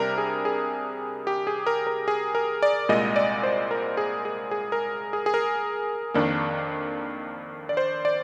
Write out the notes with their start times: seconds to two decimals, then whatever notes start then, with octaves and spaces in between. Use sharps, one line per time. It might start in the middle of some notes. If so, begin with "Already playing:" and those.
Already playing: C3 G3 D4 A#4
0.18 G#4
0.45 G#4
1.27 G4
1.47 G#4
1.67 A#4
1.87 A#4
2.08 G#4
2.35 A#4
2.63 D5
2.89 C2 A#2 G#3 D#5
3.16 D5
3.43 C5
3.71 A#4
3.97 G#4
4.25 G#4
4.51 G#4
4.72 A#4
5.13 G#4
5.26 G#4
5.34 A#4
6.14 F2 D#3 A#3 D4
7.69 D5
7.77 C5
8.05 D5